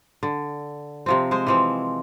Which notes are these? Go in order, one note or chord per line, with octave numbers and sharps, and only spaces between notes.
D3
C3 F3 C4
G#3 C5
E3 F3 C4